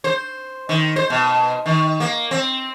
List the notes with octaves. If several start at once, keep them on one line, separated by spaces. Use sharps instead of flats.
C5
D#3
C5
B2
D#3
A#3
C4